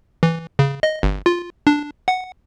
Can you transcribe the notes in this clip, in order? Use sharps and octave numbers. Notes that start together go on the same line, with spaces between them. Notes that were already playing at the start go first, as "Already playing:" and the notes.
E3
C#3
D#5
G1
F4
D4
F#5